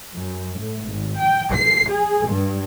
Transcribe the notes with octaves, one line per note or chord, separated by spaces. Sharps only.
F#2
A2
G#1
G5
C7
G#4
G2